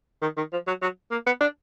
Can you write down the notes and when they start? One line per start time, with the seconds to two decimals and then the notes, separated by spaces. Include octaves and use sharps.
0.22 D#3
0.37 D#3
0.52 F3
0.67 F#3
0.82 F#3
1.11 A#3
1.27 B3
1.41 D4